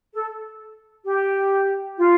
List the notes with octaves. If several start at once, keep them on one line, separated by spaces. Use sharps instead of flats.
A4
G4
F4